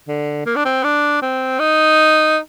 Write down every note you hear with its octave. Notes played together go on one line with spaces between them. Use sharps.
D3
A#3
D4
C4
D4
C4
D#4